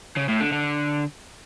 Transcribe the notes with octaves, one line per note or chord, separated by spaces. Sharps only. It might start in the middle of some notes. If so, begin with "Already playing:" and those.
C#3
A2
D3
D3